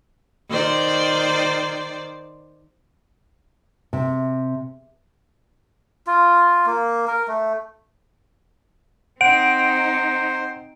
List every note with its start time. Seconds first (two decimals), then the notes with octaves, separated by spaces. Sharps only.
0.50 D#3 C5 D5
3.93 C3
6.07 F4
6.66 A#3
7.08 A#4
7.28 A3
9.21 C4 D#4 C5 F#5 D7